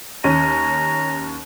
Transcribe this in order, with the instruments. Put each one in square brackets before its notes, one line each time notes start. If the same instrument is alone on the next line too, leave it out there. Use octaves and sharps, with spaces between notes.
[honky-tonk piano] D#2 C#4 D#7 [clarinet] A#5